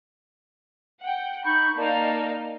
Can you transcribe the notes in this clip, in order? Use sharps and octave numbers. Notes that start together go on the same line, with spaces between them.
F#5 G5
D#4 B5 C#6 G6
A#3 D#4 D5 F5 A5